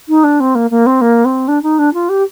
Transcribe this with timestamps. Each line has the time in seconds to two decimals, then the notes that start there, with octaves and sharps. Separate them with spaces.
0.09 D#4
0.24 D4
0.40 C4
0.55 A#3
0.71 A#3
0.86 C4
1.01 A#3
1.25 C4
1.48 D4
1.63 D#4
1.79 D4
1.94 F4
2.09 G4